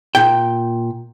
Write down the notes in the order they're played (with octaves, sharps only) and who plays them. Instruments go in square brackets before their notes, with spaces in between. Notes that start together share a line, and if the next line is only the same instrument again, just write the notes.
[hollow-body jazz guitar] A#2 G5